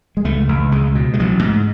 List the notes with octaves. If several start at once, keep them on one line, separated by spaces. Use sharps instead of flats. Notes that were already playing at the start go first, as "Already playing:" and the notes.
G#3
C#2 A3
C#2
C#2 G#3
B2
G#3
A1 F#3
G#2